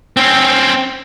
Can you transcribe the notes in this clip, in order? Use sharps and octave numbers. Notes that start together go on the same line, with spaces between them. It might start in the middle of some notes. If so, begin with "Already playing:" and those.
C4 C#4